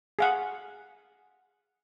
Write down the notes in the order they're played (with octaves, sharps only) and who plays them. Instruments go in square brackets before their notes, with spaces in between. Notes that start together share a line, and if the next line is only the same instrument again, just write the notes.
[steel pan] G#4 F5 F#5